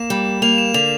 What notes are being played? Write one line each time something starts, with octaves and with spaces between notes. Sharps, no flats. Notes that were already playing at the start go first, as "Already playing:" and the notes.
Already playing: A#3 E7
G3
A#3 F7
E7
D3 F7